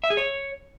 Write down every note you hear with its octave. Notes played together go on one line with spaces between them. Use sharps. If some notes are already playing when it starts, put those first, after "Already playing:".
E5
G#4
C#5